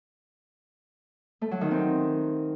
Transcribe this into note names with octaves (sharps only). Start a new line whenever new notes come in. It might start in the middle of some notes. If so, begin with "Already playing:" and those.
A3
F#3
D#3
C4